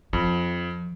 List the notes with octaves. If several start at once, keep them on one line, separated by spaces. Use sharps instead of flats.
F2 F3